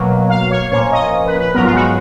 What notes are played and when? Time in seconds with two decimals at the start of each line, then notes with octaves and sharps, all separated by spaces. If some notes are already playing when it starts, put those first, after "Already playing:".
Already playing: B2 F#3 A#3
0.30 F5
0.51 C#5
0.72 A#2 F3 A#3 C#4 C#5
0.92 D#5
1.26 B4
1.40 B4
1.54 G#2 F#3 B3 A#4
1.65 F4
1.75 F#4